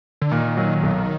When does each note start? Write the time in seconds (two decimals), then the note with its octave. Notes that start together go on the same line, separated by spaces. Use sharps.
0.22 D3
0.31 A#2 D#3
0.57 F#3
0.83 B1